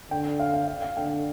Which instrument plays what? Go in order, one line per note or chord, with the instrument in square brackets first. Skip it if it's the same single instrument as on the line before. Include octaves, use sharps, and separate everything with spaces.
[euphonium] D3 [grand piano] G5
[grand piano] F5
F5
F5
F5
[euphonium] D3 [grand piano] G5